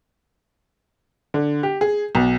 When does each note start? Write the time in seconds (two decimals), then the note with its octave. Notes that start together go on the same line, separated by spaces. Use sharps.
1.34 D3
1.63 G4
1.81 G#4
2.15 B1